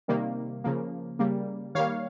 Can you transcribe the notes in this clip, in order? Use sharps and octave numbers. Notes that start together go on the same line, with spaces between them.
C3 D#3 G3 A#3
C#3 F3 A#3
C#3 G3 A#3
D#3 G3 A#3 C#5 F5